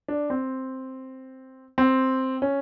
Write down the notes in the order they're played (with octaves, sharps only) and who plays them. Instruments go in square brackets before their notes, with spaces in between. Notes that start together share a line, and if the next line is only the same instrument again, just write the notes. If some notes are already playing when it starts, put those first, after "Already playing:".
[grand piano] D4
C4
C4
C#4